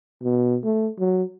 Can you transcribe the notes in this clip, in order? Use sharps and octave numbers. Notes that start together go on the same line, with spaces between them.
B2
A3
F#3